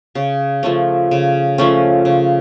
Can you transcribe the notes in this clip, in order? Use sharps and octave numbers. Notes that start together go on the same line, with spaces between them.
C#3
F3 A3 C#4
C#3
F3 A3 C#4
C#3